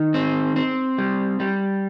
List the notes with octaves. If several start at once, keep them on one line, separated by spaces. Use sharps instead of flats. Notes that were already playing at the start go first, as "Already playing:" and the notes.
Already playing: D#3
C4
C4
G3
G3